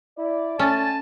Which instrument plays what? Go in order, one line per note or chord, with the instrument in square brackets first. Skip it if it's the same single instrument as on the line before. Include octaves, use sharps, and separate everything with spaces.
[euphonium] E4 [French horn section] D5
[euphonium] A3 [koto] C#4 [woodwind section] G#5 A5